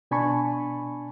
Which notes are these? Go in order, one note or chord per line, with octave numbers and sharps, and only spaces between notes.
B2 D4 G#5 A5 B5 C#6